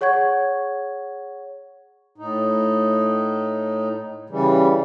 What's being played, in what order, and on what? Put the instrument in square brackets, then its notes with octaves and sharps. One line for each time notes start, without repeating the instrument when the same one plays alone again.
[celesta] G#4 C#5 F#5 C#6 G#6
[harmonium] A2 D#4
C#3 E3 G3